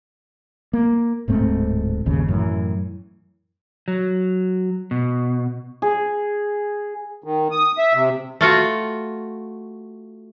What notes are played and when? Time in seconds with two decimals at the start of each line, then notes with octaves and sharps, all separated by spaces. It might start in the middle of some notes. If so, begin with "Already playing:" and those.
0.73 A#3
1.28 D1 G#2 A3 C4
2.06 G1 D#2 C#3
2.28 F#2 A2 E3
3.88 F#3
4.91 B2
5.82 G#4
7.24 D#3
7.51 D#6
7.78 E5
7.94 C3
8.41 A3 F4 F#4